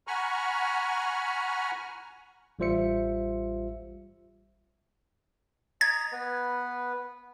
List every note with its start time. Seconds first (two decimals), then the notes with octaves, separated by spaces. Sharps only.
0.07 F#5 G#5 A#5 B5 C#6 F6
2.59 A1 G3 F4 C5 E5 C#7
5.81 D#5 A#5 G#6
6.12 B3 B4